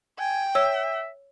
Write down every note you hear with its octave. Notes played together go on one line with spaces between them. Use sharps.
G5 G#5
C#5 E5 E6